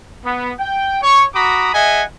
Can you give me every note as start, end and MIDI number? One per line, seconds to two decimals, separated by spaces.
0.24 0.51 59
0.59 0.98 79
1.02 1.25 73
1.02 1.25 85
1.34 1.70 66
1.34 1.70 82
1.34 1.70 83
1.34 1.70 86
1.34 1.70 87
1.73 2.03 68
1.73 2.03 75
1.73 2.03 76
1.73 2.03 78
1.73 2.03 80